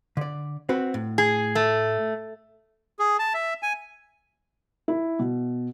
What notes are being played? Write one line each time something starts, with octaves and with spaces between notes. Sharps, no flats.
D3 D5
C4 F#4 B4
A2
G#4
A3
G#4
A5
E5
G#5
E4
B2